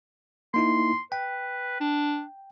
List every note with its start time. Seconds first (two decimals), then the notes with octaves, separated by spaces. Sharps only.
0.54 A#3 D#4 E4 C6
1.12 B4 G5
1.81 D4